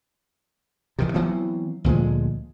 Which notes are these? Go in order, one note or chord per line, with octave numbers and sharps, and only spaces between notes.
C3 D#3 E3
E3 F#3 B3 C4
D2 A#2 F3 G#3